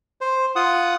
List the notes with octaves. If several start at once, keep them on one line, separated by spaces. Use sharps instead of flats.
C5
F4 F#5 D#6